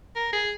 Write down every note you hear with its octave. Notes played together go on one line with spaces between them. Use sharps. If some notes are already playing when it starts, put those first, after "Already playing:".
A#4
G#4